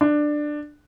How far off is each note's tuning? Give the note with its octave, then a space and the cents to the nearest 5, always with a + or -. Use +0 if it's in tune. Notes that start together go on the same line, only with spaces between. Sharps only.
D4 +15